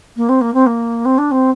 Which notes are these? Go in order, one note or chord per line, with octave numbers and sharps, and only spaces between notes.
A#3
C4
A#3
C4
A#3
C4
D4
C4